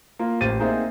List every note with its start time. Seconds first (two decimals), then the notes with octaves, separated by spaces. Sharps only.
0.19 A#3 F4
0.41 A1 G4 C5 A6 D#7
0.60 A#3 C4 D#4 G#4 C5 E5